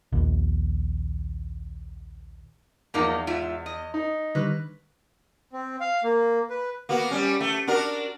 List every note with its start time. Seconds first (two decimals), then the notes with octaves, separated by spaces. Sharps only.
0.12 A#1 D#2
2.94 E2 F3 A#3 D#4
3.27 G#2 F4 E5
3.66 D#5
3.94 D#4
4.35 D3 D#3 G3 B4
5.53 C4
5.80 F5
6.04 A#3
6.50 B4
6.89 A#3 B3 F#4
7.11 G3 C#4
7.41 A3
7.67 D4 F#4 A#4